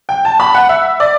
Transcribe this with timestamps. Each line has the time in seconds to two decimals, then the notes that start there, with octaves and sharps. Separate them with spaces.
0.09 G5
0.25 A5
0.40 B5
0.55 F#5
0.69 E5
1.00 D5